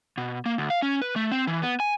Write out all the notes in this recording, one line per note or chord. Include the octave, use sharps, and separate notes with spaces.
B2
A#3
D2
F5
C#4
B4
A3
C4
E3
B3
G#5